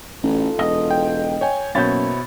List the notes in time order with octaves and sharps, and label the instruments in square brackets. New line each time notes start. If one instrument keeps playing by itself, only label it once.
[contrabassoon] A1 [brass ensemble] D#4 F4 A4
[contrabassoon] E1 [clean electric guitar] D#5
[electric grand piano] G5
C#5 G5 G#5
[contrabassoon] F#2 [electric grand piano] B2 C#5 A6 [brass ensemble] A#3 [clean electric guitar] E4 C5